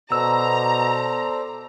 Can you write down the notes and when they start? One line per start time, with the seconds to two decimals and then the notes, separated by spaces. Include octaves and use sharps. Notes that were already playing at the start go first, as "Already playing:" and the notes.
0.12 B2 A4 C5 D5 A#5 E6